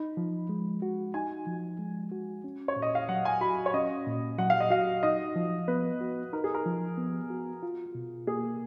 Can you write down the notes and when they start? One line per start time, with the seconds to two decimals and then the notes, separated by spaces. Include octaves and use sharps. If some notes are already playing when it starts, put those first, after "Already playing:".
Already playing: D#4 B5
0.17 F3
0.49 G#3
0.82 F#4
1.14 D#4 G#5
1.47 F3
1.79 G#3
2.12 F#4
2.44 C#4
2.68 C#5
2.76 A#2
2.82 D#5
2.95 F5
3.09 F#3 F#5
3.25 G#5
3.41 F#4 B5
3.66 C#5
3.74 C#4 D#5
4.06 A#2
4.38 F#3 F#5
4.50 F5
4.60 D#5
4.70 F#4 F5
5.03 D#4 D#5
5.36 F3
5.68 B3 B4
6.01 F#4
6.33 D#4 A#4
6.44 G#4
6.54 A#4
6.66 F3
6.98 B3
7.30 F#4
7.63 F4
7.95 B2
8.27 A#3 G#4